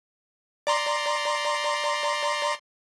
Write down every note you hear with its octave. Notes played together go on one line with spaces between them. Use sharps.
D5 A#5 C6